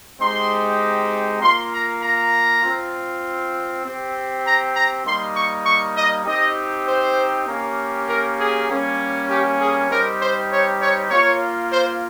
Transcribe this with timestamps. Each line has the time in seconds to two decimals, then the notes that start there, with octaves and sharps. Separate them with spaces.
0.20 G#3 C4 D#4 G4 C6
1.41 A#3 F4 C6
1.72 A#5
2.02 A#5
2.63 C4 F4
3.83 C4 G4
4.44 A#5
4.74 A#5
5.05 G3 A#3 D#4 C6
5.34 C#6
5.65 C#6
5.95 D#5
6.26 C4 D#4 G4 D#5
6.87 C5
7.47 A#3 C#4 G4
8.08 A#4
8.38 G#4
8.68 G3 A#3 C#4
9.29 G4
9.59 G#4
9.89 G3 C4 D#4 G4 A#4
10.20 C5
10.50 C#5
10.80 C#5
11.10 A#3 F4 C#5
11.71 C5